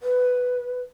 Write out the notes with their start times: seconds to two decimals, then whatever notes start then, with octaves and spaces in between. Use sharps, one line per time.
0.01 B4